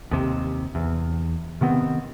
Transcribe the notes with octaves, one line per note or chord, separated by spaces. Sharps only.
D#2 C3
E2
C3 D#3 B3 C4